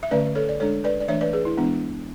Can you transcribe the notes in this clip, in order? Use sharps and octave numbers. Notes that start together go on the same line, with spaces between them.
E5
D3 A3 C#4 B4 D5
A4 C#5
D5
G#3 D4 A4 C#5
B4 D5
D5
E3 A3 D4 C#5 E5
B4 D5
G#4 B4
E4
E3 G#3 B3 D4